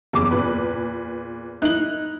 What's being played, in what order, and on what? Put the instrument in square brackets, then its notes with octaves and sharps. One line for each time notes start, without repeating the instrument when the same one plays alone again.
[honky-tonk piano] F#1 D6 [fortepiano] E2
[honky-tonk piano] A#2 B4
[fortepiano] D#4 E4 [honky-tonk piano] F#6 F#7